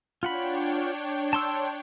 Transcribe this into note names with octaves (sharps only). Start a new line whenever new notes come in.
D4 F4 C#5 F#5 G5 B5
A5 C6 E6